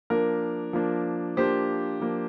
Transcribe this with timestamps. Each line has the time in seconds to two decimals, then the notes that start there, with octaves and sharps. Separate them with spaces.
0.10 F3 A#3 D4 A#4
0.73 F3 A#3 D4
1.37 F3 A#3 D4 G4 C5
2.00 F3 A#3 D4